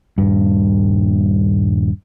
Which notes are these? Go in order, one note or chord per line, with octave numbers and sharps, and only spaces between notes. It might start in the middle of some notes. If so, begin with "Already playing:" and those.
D#1 G2